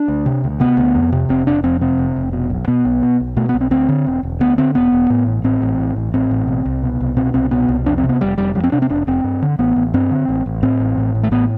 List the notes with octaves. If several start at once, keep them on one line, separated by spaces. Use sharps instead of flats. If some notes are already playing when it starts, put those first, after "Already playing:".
Already playing: D4
D2
C3
D2
C3 B3
D2
F2
C3
F1 C4
F1 D4
F2 C4
C3 C4
F1
F1
B2
B1
B2 B3
B1
B2
B1
B2 A3
B3
B1
C4
D2 C4
D3
E1
E1
D2 B3
D3 C4
E1 B3
E1
A2
A1
A2 C4
A1
A2
A1
A2 C4
A1
B2
C2
B2
C2
B2 C4
C2 C4
B2 B3
C2
F2 D4
C4
C3
B3
F1 G3
F1 G3
F2 G3
C4
C3 D4
C4
F1 D4
F1 C4
G2
D3
A1 B3
A1
G2 C4
D3
A1
A1
A2 C4
A1
A2
A1
A3
A2 B3